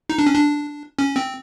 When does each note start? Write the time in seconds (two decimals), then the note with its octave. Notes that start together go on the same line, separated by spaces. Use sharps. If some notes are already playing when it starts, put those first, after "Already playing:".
0.09 D#4
0.18 D4
0.26 C#4
0.34 D4
0.99 C#4
1.16 C4